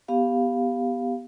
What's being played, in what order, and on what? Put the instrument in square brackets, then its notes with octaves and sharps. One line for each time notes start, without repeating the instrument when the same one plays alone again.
[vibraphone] B3 G4 F5